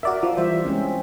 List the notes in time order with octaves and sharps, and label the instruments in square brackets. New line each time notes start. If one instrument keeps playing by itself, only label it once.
[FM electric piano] F#4 D5 E5 [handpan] A#4
[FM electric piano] F3
[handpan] E3 G3 E5 [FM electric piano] C5
[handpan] G#3 C4 C#4